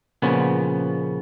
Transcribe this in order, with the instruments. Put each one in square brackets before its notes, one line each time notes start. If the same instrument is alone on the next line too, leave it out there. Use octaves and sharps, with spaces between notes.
[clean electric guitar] A#2 C#3 F3 B3